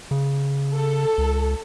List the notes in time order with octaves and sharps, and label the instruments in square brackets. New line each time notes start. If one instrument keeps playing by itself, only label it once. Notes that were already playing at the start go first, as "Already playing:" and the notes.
[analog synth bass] C#3
[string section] A4
[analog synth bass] C#2